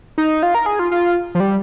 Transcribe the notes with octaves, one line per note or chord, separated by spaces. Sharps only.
D#4
F4
A#4
G#4
F4
F4
F3
G3